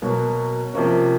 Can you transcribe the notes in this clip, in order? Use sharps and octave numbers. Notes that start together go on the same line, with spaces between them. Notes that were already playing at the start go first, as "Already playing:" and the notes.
B2 F#3 A#3
C3 F3 A#3 C#4